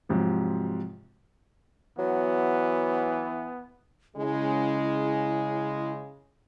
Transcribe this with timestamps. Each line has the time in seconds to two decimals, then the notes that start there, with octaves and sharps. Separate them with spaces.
0.09 G#2 C3 F3 F#3
1.98 E3 F#3 B3
4.17 C#3 G#3 E4